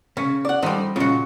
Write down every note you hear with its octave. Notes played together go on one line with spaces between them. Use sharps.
C#3 C#4
D5 F#5
F3 G3 A3 D#4
A#2 C#3 F4 F#4